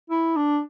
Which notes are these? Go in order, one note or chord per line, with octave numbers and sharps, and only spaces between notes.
E4
D4